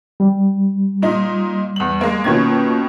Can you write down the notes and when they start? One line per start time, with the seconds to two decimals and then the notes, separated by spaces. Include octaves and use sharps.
0.20 G3
1.02 A#2 D#4
1.76 E2 F#7
2.01 G#3 A#3
2.24 B2 D#3 A#3 C#4 F4 G#6